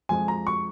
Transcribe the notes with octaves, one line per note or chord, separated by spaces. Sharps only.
F2 F3 G#3 G#5
A#5
C#6